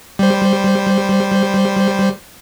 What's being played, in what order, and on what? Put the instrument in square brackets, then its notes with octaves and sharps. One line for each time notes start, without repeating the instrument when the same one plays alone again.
[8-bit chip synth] G3 C5